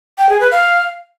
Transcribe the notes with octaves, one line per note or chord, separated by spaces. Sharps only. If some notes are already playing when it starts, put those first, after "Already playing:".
G5
G#4
B4
F5